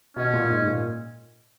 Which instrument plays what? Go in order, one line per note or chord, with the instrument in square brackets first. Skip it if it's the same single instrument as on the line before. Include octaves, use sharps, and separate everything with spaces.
[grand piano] B2 [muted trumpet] C#4
[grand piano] A#2
G#2
A#2